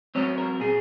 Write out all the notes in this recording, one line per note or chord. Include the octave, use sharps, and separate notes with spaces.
F#3 C4 C#5
A#4
A#2 G#4